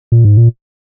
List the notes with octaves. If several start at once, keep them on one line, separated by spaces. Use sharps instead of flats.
A#2
G#2
A#2